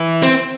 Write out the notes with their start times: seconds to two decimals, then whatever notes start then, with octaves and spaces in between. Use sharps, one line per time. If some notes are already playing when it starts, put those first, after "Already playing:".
Already playing: E3
0.23 C4